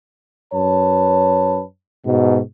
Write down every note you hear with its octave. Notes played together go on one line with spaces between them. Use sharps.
F#2 B4 C#5 A5
G#2 B2